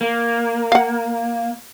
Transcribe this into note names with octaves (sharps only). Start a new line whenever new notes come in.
A#3
F5 F#5